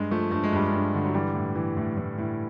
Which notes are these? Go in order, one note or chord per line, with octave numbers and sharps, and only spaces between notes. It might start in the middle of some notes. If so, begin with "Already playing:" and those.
Already playing: G2 G#3
F3 A3
G2 A3
G#3
G2 G3
G#3
G2
D3
F#3
E3 G3
A2
E3
A2
A2
A2